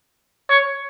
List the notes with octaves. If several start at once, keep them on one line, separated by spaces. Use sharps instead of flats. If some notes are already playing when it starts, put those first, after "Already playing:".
C#5